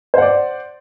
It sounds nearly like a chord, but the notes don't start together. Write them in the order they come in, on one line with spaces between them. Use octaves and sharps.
C5 F#5 D5